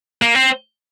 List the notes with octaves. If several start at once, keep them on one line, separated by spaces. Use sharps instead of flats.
A#3
C4